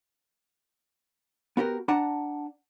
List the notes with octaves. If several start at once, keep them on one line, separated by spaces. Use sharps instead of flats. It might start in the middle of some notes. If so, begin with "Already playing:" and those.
B3 F#4 G4 A#4
D4 F#5 A5 A#5